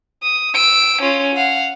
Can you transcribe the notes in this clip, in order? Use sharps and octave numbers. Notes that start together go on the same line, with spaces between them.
D#6
E6 D7
C#4 F4
F5 F#5